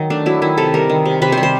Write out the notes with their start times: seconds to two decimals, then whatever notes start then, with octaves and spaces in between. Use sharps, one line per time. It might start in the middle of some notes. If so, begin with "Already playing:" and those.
Already playing: D#3 F#3
0.10 A3 D4
0.26 F#3 E4
0.42 D#3 E4
0.57 C3 A4
0.74 G3 A#4
0.89 D#3
1.05 C3
1.22 C3 B4
1.32 C5
1.37 G3
1.43 C5